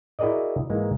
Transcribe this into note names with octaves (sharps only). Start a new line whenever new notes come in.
E4 F#4 G#4 A#4 D5 D#5
G#2 E3 G#3 A#3